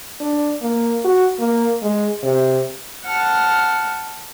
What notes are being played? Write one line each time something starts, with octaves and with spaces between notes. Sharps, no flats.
D4
A#3
F#4
A#3
G#3
C3
F#5 A5 F6